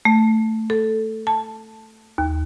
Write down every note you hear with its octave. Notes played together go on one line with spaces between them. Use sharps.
A3
A4
A5
D#2